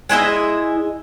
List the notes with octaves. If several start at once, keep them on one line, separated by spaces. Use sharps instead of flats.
G#3 E4 D#5 E5